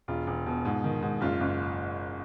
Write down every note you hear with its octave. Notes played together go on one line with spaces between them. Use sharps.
E1 F4
E1
B2
G#2
D#3
G#2
F#1 F4
F#1